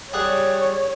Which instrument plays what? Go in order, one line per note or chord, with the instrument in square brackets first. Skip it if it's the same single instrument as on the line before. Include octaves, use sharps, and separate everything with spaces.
[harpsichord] G3 G#4 F#5 [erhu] C#5